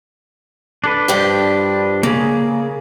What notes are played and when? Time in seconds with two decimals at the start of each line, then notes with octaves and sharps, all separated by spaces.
0.84 D4 A4 B4
1.08 G2 F3 G4
2.03 C#3 A#3 G#4